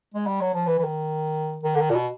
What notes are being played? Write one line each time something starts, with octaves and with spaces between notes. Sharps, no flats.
G#3
G3
F#3
F3
E3
E3
D#3
D#3
D3
D#3
A#2
B2